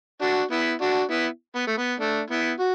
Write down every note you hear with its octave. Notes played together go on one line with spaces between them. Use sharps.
D4 F#4
B3 E4
D4 F#4
B3 E4
B3
A3
B3
A3 D4
B3 E4
F#4